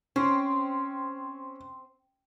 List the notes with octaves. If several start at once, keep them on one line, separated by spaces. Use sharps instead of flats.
C4 C#4